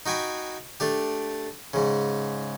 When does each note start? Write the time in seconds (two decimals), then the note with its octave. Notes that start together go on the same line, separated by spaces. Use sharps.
0.06 D#4 F#4 G5 G#5 B5
0.80 A3 D4 G4
1.74 G#2 C#3